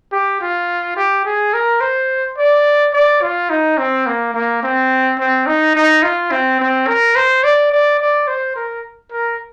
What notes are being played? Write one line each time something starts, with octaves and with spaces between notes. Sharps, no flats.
G4
F4
G4
G#4
A#4
C5
D5
D5
F4
D#4
C4
A#3
A#3
C4
C4
D#4
D#4
F4
C4
C4
A#4
C5
D5
D5
D5
C5
A#4
A#4